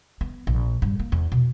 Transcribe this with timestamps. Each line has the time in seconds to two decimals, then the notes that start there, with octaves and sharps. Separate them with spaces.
0.21 B3
0.47 A#1
0.82 G2
1.00 A#3
1.12 E2
1.32 B2